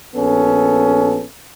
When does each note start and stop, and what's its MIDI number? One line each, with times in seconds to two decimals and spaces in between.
0.15 1.23 34
0.15 1.23 59
0.15 1.23 61
0.15 1.23 69